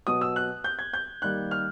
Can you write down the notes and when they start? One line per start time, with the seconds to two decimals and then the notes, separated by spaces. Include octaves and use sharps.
0.07 B2 F#3 B3 D#6
0.21 E6
0.36 F#6
0.64 G6
0.79 G#6
0.93 G6
1.22 D#3 G3 A#3 F#6
1.51 F6